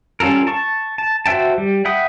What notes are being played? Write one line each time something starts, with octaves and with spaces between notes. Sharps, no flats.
G3 C#4 F4 A4 A#4
A5 C#6
A5
F#4 C5 E5 G5 A5
G3
E5 F#5 G5 B5 D#6